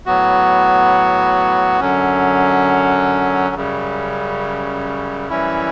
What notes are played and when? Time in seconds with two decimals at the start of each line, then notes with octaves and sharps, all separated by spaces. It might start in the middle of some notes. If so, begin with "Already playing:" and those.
0.06 A2 F#3 B3 F#4
1.80 F#2 D3 F#3 C#4
3.55 F#2 C#3 G3
5.29 F#2 E3 G3 C#4 E4